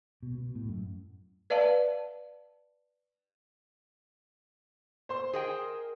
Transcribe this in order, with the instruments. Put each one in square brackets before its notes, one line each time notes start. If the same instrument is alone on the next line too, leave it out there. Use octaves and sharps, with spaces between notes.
[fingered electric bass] B2
B2
A2
F#2
[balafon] B4 D5 E5 F5 A5
[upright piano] C5 C6
[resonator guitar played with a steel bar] G#4 D#5 G5 [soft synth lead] A#4